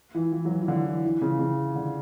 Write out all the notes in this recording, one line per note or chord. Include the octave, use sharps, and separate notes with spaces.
E3
E3
F#3
E3
E3
D3
E3
E3
C#3
C#3
D3